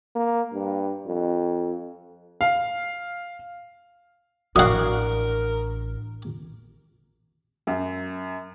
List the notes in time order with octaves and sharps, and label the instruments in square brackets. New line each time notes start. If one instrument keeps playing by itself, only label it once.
[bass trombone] A#3
G2
F2
[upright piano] F5
[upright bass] A1 D4 [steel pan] F#4 D5 F5 [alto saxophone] A#4 [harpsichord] F#5 D#6
[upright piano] F#2